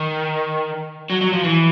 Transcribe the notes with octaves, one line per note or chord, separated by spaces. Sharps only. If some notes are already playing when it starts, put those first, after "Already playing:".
Already playing: D#3
F#3
F#3
F3
E3